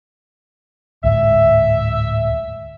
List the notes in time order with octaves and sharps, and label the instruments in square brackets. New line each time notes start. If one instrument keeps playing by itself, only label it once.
[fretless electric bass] D1 D2 G#2 [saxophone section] E5